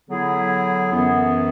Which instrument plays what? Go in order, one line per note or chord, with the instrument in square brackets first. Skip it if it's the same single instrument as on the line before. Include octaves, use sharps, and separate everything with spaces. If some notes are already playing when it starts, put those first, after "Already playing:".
[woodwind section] D3 F#3 B3 E4 G#4
F#2 E3 B3